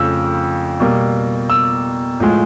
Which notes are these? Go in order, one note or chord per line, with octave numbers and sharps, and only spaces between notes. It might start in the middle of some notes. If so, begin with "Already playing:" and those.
Already playing: F2 C#3 F3 A3 E6
B2 G3 A#3
E6
A2 F3 G#3